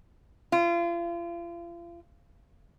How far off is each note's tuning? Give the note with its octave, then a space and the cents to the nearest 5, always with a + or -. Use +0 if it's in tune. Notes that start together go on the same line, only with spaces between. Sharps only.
F4 -35